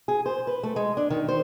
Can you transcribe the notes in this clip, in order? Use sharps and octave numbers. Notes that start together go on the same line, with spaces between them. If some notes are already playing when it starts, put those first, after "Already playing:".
G#4
C5
B4
A3
G#3
D4
D#3
C5